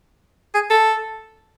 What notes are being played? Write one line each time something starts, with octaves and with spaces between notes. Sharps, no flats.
G#4
A4